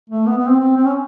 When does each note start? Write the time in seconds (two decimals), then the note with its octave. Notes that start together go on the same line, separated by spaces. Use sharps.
0.10 A3
0.27 B3
0.37 B3
0.48 C4
0.60 C4
0.77 C4
0.85 C#4